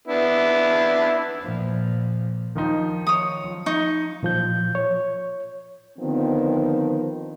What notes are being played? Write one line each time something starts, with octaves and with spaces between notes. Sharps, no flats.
B3 D4 E4
A#2 F3
D#3 F3 D#4
C#5 D#6
F3
D#4 C#6
A#2 F3 G6
C#5
D3 D#3 F3 B3 C4